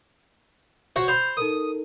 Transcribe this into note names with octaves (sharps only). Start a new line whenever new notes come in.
F#4 C5 C#5
C5 B5 C6 G6 F7
D#4 A4 A#4 D#6